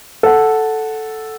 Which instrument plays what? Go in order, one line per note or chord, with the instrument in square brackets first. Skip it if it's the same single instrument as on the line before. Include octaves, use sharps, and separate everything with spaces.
[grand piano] A4 F#5